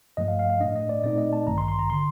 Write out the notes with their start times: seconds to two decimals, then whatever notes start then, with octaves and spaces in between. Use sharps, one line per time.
0.17 G2 F3 A3 D#5
0.28 F5
0.39 F5
0.50 F5
0.60 A2 A3 D4 D#5
0.76 D#5
0.89 D5
1.04 A#2 A3 C4 D#4 D5
1.18 D#5
1.33 A5
1.47 A1 G2 D#3 A#5
1.58 C6
1.68 C6
1.79 A#5
1.90 D3 C6